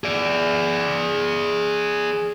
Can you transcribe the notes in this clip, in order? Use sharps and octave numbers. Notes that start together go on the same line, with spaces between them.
G#4 D5